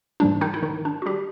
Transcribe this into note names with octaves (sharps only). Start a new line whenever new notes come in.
G#2 E3 G3 A#3 D4
D#3 D#4
E4
D#3 D#4
D4
F#4
G3 G4